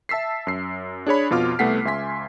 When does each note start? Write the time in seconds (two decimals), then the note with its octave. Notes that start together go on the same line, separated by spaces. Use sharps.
0.09 E5 A5 E6 B6 C7
0.47 F#2 C7
1.06 D4 G#4 C#5 B5
1.30 F2 B2 F4 D6 F6
1.59 C2 A3 B3 F#5 B6 C7
1.85 C#2 E5 G#5 C6 B6